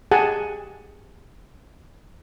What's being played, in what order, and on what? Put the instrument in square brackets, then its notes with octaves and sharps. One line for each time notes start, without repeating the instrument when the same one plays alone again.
[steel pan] G4 G#4 F#5 G#5 A5